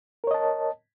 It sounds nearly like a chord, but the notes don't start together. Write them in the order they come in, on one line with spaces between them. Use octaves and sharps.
A#4 C#5 D#5 A5